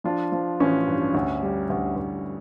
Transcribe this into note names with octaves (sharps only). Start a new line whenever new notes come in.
F3 D4 F4
F3
A1 C#4
G2
D2 C#4
G3
D2
D2